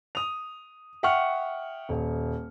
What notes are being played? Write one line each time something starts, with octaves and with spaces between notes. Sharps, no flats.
D#6 F7
E5 F#5 G5 C#6 F6 C#7
D#1